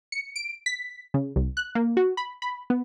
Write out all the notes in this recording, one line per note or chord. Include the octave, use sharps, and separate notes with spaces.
C#7
D7
B6
C#3
C2
F#6
A#3
F#4
B5
B5
B3